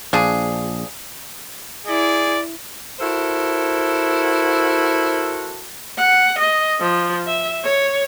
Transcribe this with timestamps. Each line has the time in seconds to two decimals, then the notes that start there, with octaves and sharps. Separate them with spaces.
0.13 A#1 F3 D4 G#4
1.87 E4 G#4 D5
3.00 E4 F#4 A4 A#4 C5
5.98 F#5
6.39 D#5
6.80 F3
7.27 E5
7.64 C#5